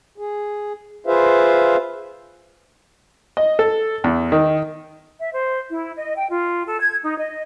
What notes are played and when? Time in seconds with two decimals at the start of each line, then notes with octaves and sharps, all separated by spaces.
0.18 G#4
1.06 F4 G#4 B4 C5 E5 F5
3.37 D#5
3.59 A4
4.04 E2
4.32 D#3
5.20 E5
5.33 C5
5.70 E4
5.96 D#5
6.16 G5
6.29 F4
6.66 A4
6.80 G#6
7.03 D#4
7.18 D#5